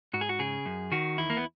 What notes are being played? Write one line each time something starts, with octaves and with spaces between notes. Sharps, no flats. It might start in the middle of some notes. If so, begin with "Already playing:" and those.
G#2 F#4
G#4
F#4
C#3 G#4
F#2
D#3 F#4
E2 E4
A#3
B3